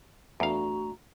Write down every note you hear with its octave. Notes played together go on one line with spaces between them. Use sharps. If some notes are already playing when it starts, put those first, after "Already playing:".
E2 A3 D4 F#4 F5 A#5